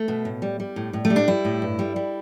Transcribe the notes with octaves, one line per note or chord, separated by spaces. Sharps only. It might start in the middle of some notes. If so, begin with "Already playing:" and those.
Already playing: A3
B2
A2
G3
G3
A2
A2
A3
G3
D4
G3 E4
A2
G2
G3
G3